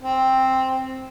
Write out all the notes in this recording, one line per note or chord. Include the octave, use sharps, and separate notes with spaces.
C4